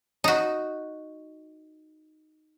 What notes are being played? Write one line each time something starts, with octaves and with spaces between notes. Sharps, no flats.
D#4 F#4